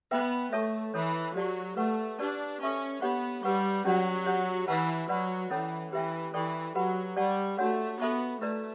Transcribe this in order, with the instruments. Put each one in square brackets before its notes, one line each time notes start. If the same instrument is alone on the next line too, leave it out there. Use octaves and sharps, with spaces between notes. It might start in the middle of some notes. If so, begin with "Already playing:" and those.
[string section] B3 [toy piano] B4 E5 G5
[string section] A3 [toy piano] A4 C#5 E5 A5 C#6
[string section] E3 [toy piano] E4 A4 C#5
[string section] F#3 [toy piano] G4 D5 A5 C#6
[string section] A3 [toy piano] B4 F#5 C#6
[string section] D4 [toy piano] G4 B4 D5 A5 C#6
[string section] C#4 [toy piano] A4 E5 A5 C#6
[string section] B3 [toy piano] D4 G4 C#5 F#5 C#6
[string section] G3 [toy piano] G4 B4 F#5 C#6
[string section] F#3 [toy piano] C#4 G4 D5 F#5
[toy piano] G4 C#5 F#5
[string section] E3 [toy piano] B4 F#5 A5
[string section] F#3 [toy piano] B4 D5 F#5 B5
[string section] E3 [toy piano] C#4 E4 A4 C#5
[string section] E3 [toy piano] G4 B4 E5 G5
[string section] E3 [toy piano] A4 D5 G5 C#6
[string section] F#3 [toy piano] G4 B4 F#5 B5
[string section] G3 [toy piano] G4 D5 F#5 A5 C#6
[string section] A3 [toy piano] D4 F#4 C#5 F#5
[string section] B3 [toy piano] A4 E5 A5 C#6
[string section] A3 [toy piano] E4 B4 D5